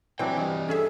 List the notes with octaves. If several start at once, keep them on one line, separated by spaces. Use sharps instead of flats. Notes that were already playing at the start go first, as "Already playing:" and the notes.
E3 F#3 C4 D4 D5 G5
G2 E3 D#5
C#4 G#4 A4 E5